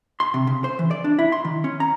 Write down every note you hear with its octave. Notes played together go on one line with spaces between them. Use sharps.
C6
C3
C#3
C5
E3
D5
D4
E4
C6
D#3
C#4
A#5